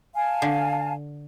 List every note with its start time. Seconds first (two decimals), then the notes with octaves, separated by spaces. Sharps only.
0.15 F5 G#5 A5
0.42 D3